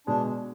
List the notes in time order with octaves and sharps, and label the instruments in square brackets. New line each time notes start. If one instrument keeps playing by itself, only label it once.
[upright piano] B2 G#3 [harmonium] D4